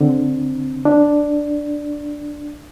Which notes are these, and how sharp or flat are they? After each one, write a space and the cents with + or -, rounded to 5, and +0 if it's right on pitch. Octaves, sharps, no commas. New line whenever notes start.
D3 +0 C4 +0
D4 +0 D5 +0